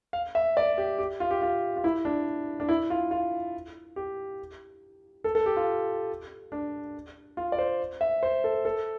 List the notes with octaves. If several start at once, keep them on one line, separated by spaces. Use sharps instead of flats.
F5
E5
D5
G4
G4
F4
G4
F4
F4
E4
D4
D4
E4
F4
F4
G4
A4
A4
G4
F4
D4
F4
D5
C5
E5
C5
A4
A4